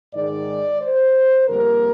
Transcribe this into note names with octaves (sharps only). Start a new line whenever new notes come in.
G#2 D#3 G#3 D5
C5
F2 D3 G3 A#3 A#4